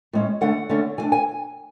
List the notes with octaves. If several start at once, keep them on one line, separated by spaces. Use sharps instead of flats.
A2 G#3 C#4
D3 A3 C#4 F#5
D3 A3 C#4
E3 A3 D4 G#5
G#5